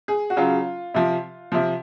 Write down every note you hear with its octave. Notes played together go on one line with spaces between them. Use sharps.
G#4
F#4
C#3 F#3 F4
C3 F3
C3 F3